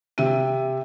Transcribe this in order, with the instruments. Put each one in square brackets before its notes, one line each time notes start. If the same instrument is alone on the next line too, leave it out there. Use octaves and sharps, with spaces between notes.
[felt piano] C3 E5 D#7